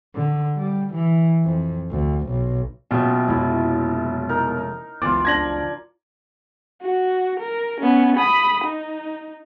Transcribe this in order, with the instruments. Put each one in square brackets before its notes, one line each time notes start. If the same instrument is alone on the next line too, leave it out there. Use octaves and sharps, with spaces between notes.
[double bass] D3
G3
E3
F2
D2
B1
[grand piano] F#1 B2 [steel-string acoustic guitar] F4 G4 E5
[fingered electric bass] F1 F2 G#3 [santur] E4
[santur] D#4 A#4
[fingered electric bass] F#1 C#2 [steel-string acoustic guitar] E3 B3 [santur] F4 D5 [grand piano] D6
[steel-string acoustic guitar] F3 D4 [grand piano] G#6 A#6 F#7
[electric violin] F#4
A#4
B3 C#4
B5 D#6
D#4